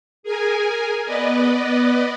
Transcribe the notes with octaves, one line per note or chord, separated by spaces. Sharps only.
G#4 A#4 G#5
B3 B4 D5 D#5